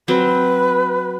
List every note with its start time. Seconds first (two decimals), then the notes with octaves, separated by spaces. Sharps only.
0.08 F#3 C4 B4